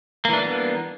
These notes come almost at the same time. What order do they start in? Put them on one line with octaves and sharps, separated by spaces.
A#3 E3 D4 G3 B3